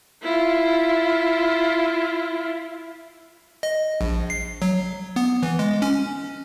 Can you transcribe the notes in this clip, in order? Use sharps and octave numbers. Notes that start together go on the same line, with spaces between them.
E4 F4
D#5
A#1
C7
F#3
B3
E3
G#3
C#4